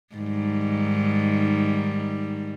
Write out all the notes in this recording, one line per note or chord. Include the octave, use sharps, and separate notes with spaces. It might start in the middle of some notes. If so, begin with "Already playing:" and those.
G#2 D#3 G3